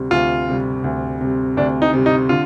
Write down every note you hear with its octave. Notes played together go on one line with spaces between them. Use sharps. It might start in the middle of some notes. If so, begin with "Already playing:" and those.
Already playing: D2 C3 G3
D2 F4
C3 G3
D2
C3 G3
D2 D4
D#4
C3 G3
D#4
D3 F4